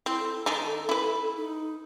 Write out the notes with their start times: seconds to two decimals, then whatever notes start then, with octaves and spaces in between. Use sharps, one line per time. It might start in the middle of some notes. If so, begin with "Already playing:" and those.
0.06 C4 E4
0.20 A4
0.46 D#3 D4 D#4
0.89 E4 B4
1.37 D#4